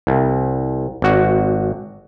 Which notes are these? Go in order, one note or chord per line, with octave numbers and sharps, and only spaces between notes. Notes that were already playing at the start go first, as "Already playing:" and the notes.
C2
G#1 F#4